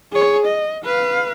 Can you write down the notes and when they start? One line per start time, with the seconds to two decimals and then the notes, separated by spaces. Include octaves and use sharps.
0.12 G#4 C#5
0.46 D#5
0.85 B4 F5